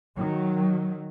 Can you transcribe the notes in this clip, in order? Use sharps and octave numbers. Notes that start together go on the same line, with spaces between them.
D#3 F#3